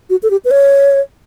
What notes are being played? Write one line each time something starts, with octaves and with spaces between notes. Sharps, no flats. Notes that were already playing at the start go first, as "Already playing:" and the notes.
F#4
A4
G4
B4
C#5